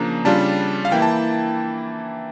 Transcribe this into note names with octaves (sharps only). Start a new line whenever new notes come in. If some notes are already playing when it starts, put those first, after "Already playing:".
Already playing: C#3 F3 A#3 D4 A#5
C#3 G3 D4 F4 A5
F5
E3 A#3 E4 G5
A5